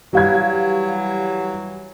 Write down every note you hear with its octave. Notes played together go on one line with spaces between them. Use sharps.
E3 F#3 G3 F5 G#6